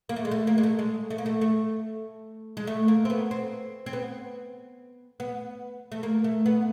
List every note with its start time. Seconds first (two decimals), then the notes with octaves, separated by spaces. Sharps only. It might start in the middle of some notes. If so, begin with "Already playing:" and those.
0.09 A#3
0.16 A3
0.25 G#3
0.31 A3
0.47 A#3
0.58 G#3
0.63 A3
0.79 G#3
1.10 A3
1.18 A#3
1.26 A3
1.41 A3
2.57 G#3
2.67 A3
2.88 A#3
3.05 C4
3.10 B3
3.31 C4
3.86 C4
3.93 B3
5.20 B3
5.92 A3
6.03 A#3
6.24 A3
6.46 B3